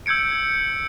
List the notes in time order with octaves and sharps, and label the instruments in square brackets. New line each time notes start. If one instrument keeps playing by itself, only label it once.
[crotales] E6 G6 G#6 C#7 D7